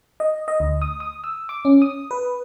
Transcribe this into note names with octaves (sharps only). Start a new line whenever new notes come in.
D#5
D#5
D2
D#6
D#6
E6
D6
C#4
D#6
B4